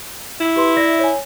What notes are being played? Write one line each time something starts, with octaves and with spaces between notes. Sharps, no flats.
E4
G4 B4 C6
D5 E5 A#6
C#5 G#5